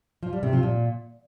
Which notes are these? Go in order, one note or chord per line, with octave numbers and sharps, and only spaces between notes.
F3
G3
C3
F3
A#2